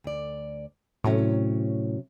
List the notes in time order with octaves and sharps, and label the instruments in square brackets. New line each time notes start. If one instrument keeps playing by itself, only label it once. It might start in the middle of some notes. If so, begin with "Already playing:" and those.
[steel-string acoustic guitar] D2 D5
[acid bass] A2 [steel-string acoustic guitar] C3 F#3 C#4